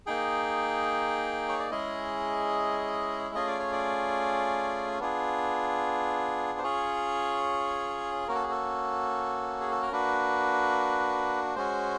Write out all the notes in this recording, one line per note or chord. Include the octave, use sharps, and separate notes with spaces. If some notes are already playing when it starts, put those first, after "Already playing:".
A#3 D#4 G#4 G5
C#5
D5
G#3 C#4 E4 G#4 D#5
A3 C#4 F4 G#4 D#5
D5
C#5
D5
B3 D4 F4 G#4
C5
C#4 F4 G#4 C#5
A#3 C#4 F#4 A#4
A4
G#4
A4
G#4
A4
A#4
A#3 D4 F#4 B4
G#3 C#4 F#4 C5